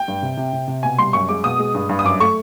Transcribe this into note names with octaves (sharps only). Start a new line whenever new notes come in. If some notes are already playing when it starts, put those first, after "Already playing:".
Already playing: G5
G2
C3
C3
C3
C3
B2 G#5
G3 C6
F#2 C#6
G#3 D6
B2 D#6
G#3
G2
G2
D#6
F#2 D6
A3 C#6